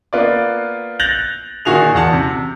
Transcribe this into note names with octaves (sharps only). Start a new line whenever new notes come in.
A#3 B3 F4 D5
F#6 G6 A6 A#6 F7 F#7
A#2 D#3 F#4 G#4 F7
E2 F#5 A5
C3